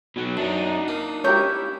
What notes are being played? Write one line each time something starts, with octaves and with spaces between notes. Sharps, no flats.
B2 F#3
F#2 D4 D#4
A#3
C#4 E4 G4 A#4 C#5 G6